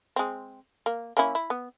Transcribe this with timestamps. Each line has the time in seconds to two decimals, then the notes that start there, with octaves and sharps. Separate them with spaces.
0.16 G#3 C4
0.86 A#3
1.17 A#3 C#4 E4
1.35 E4
1.50 B3